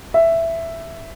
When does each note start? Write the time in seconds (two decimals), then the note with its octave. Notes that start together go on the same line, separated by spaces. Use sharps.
0.14 E5